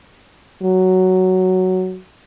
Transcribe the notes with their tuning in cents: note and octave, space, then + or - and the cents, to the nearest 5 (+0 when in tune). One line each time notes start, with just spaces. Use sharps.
F#3 +5